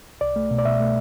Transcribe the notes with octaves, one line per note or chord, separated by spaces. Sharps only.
C2 D5
A3
B2
D5
B2 E5
A3